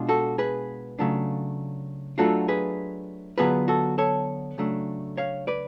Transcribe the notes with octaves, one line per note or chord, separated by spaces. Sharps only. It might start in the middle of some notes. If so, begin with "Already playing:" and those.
Already playing: B2 G#3 D4 F4
F#4 A4
G#4 B4
C#3 F#3 A3 D4 F4
F#3 A3 D4 F4 F#4 A4
G#4 B4
D3 F#3 B3 F4 G#4 B4
F#4 A4
A4 C#5
C#3 F#3 A3 D4
C#5 F5
B4 D5